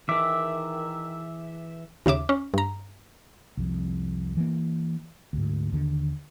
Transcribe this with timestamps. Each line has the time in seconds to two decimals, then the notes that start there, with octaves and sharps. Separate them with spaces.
0.09 D#3 E3 G#4 E5 D6
2.06 D#2 C#3 E5 D6
2.29 C#4
2.54 G2 A#5
3.57 C2 F2
4.37 E3 A#3
5.33 D2 G#2
5.72 D#2 D3